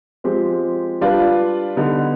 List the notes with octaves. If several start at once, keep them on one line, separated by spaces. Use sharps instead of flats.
F3 G#3 C4 G4 C5
G3 D4 F4 B4
D3 G3 B3 D#4